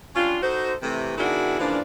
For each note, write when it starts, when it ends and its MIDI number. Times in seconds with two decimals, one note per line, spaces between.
0.16 0.37 55
0.16 0.37 61
0.16 0.37 62
0.16 0.37 65
0.42 0.74 63
0.42 0.74 66
0.42 0.74 69
0.42 0.74 72
0.82 1.16 48
0.82 1.16 52
0.82 1.16 57
1.18 1.59 47
1.18 1.59 51
1.18 1.59 62
1.18 1.59 64
1.18 1.59 66
1.18 1.59 68
1.60 1.80 49
1.60 1.80 52
1.60 1.80 53
1.60 1.80 58
1.60 1.80 62